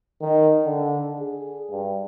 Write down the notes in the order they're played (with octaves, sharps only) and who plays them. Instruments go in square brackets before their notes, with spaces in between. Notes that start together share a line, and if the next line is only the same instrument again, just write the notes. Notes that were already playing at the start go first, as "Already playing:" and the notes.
[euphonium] D#3
D3
G#4
G2